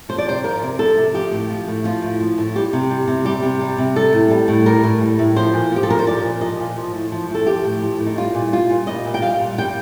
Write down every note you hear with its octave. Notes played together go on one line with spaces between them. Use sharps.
F3 C5
D5
C3 C5
F3 A#4
C3
F3 A4
C3
F3 G4
A2
F3
A2
F3 F4
A2
F3
A2
G3 G4
C3
G3
C3
G3 G4
C3
G3
C3
G3 A4
A2
G3
A2
G3 A#4
A2
G3
A2
F3 C5
A#2
F3 G4
A4
A#2 A#4
C5
F3 D5
A#2
F3 D#5
A#2
F3
A2
F3
A2
A4
F3 G4
A2
F3
A2
D#4
G3 F4
A#2
G3 F4
A#2
G3 D#5
A#2
G5
G3 F5
A#2
G3 G5